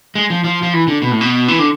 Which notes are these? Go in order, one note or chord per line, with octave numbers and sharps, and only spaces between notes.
G#3
F3
F3
F3
E3
D3
B2
A2
B2
E3
D3